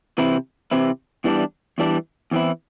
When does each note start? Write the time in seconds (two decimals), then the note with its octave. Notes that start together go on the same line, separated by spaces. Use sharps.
0.18 C3 E3 C4 E4
0.71 C3 E3 C4 E4
1.24 E2 E3 G3 D4
1.78 E2 E3 G3 D4
2.31 E2 E3 C4 E4